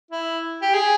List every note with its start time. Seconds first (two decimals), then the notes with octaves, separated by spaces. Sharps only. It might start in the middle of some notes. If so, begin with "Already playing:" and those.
0.11 E4
0.62 G4
0.74 G#4